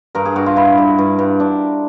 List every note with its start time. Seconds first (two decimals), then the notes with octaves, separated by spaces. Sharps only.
0.15 G2 A#4
0.25 G#4
0.36 G2 F#4
0.46 F4
0.56 G2 E4
0.78 G2
0.99 G2
1.19 G2
1.40 D4